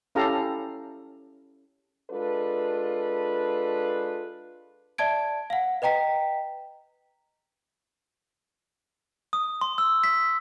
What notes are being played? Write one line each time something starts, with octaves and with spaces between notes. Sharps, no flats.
C#4 E4 G4 A4 F5 A#5
G#3 D4 F4 A4 B4
D5 E5 A5 G#6 D7
F5 F#5
B4 D#5 G5 A#5 B6
D#6
C6
E6
B6